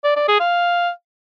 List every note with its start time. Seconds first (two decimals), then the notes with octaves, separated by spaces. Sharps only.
0.04 D5
0.16 D5
0.28 G#4
0.40 F5